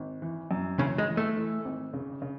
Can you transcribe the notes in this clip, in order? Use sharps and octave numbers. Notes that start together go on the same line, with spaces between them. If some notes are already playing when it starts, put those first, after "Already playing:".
Already playing: G#1
E3
F#2
C#3 E3
G#3
E3
A3
E3
G#1
C#3
C#3